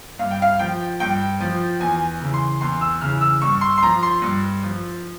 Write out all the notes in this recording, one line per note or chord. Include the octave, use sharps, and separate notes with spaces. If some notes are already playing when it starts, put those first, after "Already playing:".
G2 F5
G5
F5
F3 G5
G2 G5
F3
E2 G#5
C#3 E3
C6
E2 C6
E6
C#3 E3 F6
E6
G2 C#6
C6
C6
F3 A#5
C6
G2
F3